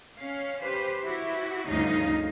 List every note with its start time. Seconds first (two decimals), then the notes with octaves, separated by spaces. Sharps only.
0.17 C#4 F5
0.63 G4 B4 C5
1.04 E4 F#4 G4
1.67 D2 G2 C#3 F3 D#4 F5